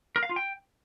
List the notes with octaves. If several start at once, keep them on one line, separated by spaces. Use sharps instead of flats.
A#4
F5
F4
G5